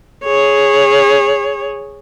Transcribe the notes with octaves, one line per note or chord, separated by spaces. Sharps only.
G#4 C#5